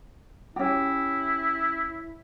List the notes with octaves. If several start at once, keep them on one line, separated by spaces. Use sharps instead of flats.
C#4 E4 G4